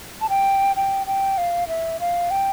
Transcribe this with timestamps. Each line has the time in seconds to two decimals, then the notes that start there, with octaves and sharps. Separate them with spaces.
0.21 A5
0.30 G5
0.76 G5
1.07 G5
1.38 F5
1.68 E5
2.00 F5
2.31 G5